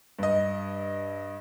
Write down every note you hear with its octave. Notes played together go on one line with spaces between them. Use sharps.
G2 D#5